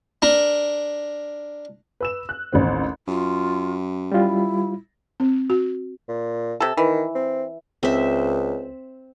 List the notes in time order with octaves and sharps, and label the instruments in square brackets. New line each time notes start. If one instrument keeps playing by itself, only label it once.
[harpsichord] D4 A#4
[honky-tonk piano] B4 E6 E7
F#6
A1 D#2 C4
[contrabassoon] F#2 [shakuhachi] F4
[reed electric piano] G3 F4 [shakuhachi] E4
[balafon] C4
F#4
[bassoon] A#2
[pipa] C3 A4
[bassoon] D#3 [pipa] E3
[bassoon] C4
[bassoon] C#2 [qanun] C4 E5